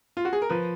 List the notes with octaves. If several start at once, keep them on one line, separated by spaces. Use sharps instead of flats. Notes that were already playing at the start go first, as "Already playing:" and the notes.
F4
F#4
G#4
A#4
F3 B4